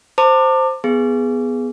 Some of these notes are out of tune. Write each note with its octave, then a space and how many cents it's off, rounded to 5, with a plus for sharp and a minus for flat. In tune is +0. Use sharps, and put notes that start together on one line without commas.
C5 +0 A5 +35 D6 +20
B3 +0 G#4 +0